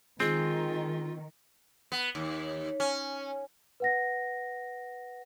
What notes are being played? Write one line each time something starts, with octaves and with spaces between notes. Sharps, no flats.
D#3 G#3 C4 F4
B3
D#2
C#4
B4 F#5 A#6